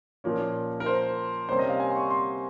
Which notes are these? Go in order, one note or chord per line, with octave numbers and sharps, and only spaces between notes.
A#2 F3 A#3 C#4
A#4
C5
C3 G3 A#3 C#4 C5
D#5
F5
G#5
C6
C#6
C6